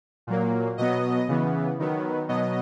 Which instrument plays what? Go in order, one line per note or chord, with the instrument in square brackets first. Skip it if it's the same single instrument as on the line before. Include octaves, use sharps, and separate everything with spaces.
[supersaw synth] A#2 F#3 A#3
B2 F#3 B3 D#5
C#3 E3 B3
D#3 F#3 B3
B2 F#3 B3 D#5